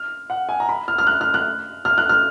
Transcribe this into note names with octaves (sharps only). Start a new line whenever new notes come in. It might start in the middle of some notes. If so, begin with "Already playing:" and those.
Already playing: F6
F#5
G#5
A#5
B5
F6
F6
F#6
F6
F#6
F6
F#6
F6